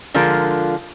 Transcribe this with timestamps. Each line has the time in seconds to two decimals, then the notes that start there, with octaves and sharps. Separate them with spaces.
0.14 D3 F3 G#3 F4 A#4